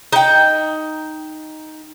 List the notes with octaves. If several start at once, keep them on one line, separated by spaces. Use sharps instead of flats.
D#4 G5